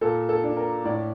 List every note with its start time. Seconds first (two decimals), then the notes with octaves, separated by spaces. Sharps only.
0.01 A#2 A4
0.29 A4
0.44 D4
0.57 A#4
0.84 A2 D5